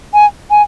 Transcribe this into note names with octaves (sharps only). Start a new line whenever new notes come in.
G#5
G#5